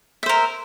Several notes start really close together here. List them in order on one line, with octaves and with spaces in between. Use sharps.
E5 C5 A#4